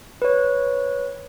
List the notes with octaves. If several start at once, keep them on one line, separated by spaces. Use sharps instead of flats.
B4 C#5